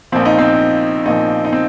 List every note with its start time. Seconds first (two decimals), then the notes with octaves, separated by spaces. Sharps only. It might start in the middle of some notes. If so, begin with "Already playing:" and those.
0.12 A#1 A#2 F3 C4
0.25 D#4
0.38 C4
1.06 A#1 A#2 F3 D#4
1.45 D#4
1.53 C4